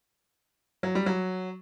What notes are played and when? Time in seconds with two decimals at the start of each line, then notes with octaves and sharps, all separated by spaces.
0.83 F#3
0.95 G3
1.06 F#3